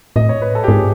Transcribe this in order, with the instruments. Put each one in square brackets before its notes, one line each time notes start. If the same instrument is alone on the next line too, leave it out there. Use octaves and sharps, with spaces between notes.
[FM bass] A2 [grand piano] D#5
[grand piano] C#5
B4
A4
G4
[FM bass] G#2 [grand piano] G#4